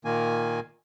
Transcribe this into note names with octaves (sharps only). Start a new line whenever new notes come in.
A#2 D#3 A#3 G#5